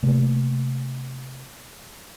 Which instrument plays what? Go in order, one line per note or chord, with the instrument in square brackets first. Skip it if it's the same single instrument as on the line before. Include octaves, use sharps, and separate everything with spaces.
[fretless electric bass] C3 A3 A#3